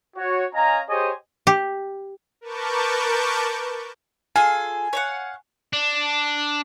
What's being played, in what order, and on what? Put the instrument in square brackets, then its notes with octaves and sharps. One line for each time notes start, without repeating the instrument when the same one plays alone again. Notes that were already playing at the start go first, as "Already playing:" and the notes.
[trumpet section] F#4 C#5
C#4 D#5 F5 G#5 A#5
G4 G#4 C5 C#5 D#5 G#5
[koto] G4
[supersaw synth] A#4 B4 A5 C#6 D6 G6
[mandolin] F4 G#4 A4 [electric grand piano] G#5
[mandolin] C#5 F5 F#5
[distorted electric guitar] D4